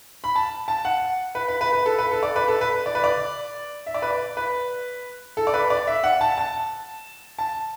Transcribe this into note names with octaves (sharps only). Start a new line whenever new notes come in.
B5
A5
A5
F#5
B4
B4
B4
B4
A4
B4
A4
D5
B4
A4
B4
D5
B4
D5
E5
D5
B4
D5
B4
A4
D5
B4
D5
E5
F#5
A5
A5
A5